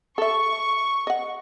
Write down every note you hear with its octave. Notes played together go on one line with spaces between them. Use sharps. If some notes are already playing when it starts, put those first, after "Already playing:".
A4 E5 C#6
D#5 F#5